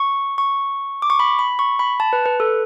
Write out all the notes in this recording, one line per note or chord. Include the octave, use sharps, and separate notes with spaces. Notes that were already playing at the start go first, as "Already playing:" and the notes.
Already playing: C#6
C#6
D6
C#6
B5
B5
C#6
B5
A5
B4
B4
A4